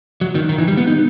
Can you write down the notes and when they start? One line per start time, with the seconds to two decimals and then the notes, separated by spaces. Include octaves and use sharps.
0.21 F#3
0.35 D#3
0.49 D#3
0.58 E3
0.68 G3
0.77 B3
0.87 D#4